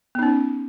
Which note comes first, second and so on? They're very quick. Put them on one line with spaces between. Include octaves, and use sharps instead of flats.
B3 D#4 C#4